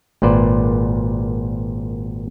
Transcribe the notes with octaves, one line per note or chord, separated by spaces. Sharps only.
G#1 A#2 B4 C5 D5